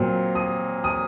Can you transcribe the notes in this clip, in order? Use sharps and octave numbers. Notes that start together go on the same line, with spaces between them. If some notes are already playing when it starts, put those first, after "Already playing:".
Already playing: A#2 F#3 C4
D#6
D#6